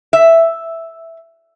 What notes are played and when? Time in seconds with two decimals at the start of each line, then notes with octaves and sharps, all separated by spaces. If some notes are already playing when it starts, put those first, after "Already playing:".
0.13 E5